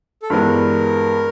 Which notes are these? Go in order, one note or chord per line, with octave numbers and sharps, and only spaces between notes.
A4
G2 E3 G#3 B3 A#4